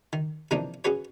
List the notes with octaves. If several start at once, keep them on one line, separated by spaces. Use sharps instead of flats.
D#3
C3 E3 F3 A#3 D4 D#4
C#4 F#4 G#4 B4 C#5